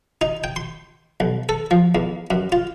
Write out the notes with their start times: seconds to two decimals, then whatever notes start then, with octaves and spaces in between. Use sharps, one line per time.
0.21 D#4
0.44 G5
0.56 C6
1.20 B1
1.49 A4
1.71 F3
1.95 E2
2.31 F#2
2.52 F4